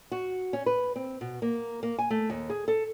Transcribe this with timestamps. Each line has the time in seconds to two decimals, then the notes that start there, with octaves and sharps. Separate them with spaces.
0.12 F#4
0.53 C#4
0.66 B4
0.96 C4
1.21 B2
1.42 A#3
1.83 A#3
1.99 G#5
2.10 A3
2.30 D#2
2.50 G#4
2.68 A4